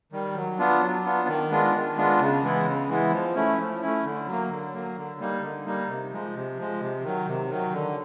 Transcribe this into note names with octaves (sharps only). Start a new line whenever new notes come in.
D#3 G3
F#3
B3 D4 F4
F#3
B3 D4 F4
D#3
G#3 B3 D4 F4
D#3
G#3 B3 D4 F4
C#3
E3 G#3 B3 E4
C#3
E3 G#3 B3 E4
F3
A3 C#4 E4
F3
A3 C#4 E4
D3
F#3 A#3
D3
F#3 A#3
D3
G3 A#3 D#4
D3
G3 A#3 D#4
C3
F3 G#3
C3
F3 G#3
C3
D#3 F#3
C3
D#3 F#3
D3